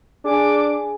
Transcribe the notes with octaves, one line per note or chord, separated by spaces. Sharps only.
D4 G#4 G#5 D6